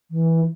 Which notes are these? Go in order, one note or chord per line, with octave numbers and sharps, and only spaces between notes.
E3